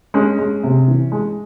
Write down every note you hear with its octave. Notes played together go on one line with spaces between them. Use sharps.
G#3 C#4
G#3
C3
E3
G#3